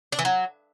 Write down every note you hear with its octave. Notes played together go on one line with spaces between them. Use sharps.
D4
E3
F#3